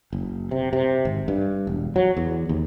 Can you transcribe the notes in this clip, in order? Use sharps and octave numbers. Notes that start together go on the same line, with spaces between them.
F#1
C3
C3
G#1
G2
E1
F#3
E2
D#2